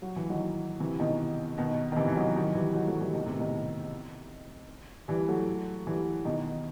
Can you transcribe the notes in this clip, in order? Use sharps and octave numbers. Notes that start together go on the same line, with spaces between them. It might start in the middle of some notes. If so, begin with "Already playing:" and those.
F#3
E3
D#3 F#3
C3 E3
B2 D#3
B2 D#3
D#3
C3 E3
E3
D#3 F#3
D#3 F#3
E3 G3
D#3 F#3
F#3 A3
E3 G3
B2 D#3
A2 C3
B2 D#3
E3 G3
F#3 A3
E3 G3
B2 D#3